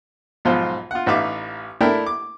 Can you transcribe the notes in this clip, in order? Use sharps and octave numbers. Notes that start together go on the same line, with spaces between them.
B1 G#2 F3 F4 C5
F4 F#5
A1 D#4 B4 E5 F5 D6
A3 D4 E4 A#4 G5
D6